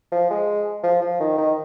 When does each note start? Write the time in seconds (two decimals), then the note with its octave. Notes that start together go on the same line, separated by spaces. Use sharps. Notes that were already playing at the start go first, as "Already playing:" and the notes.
0.12 F3
0.30 G#3
0.83 F3
1.02 F3
1.20 D#3
1.38 D#3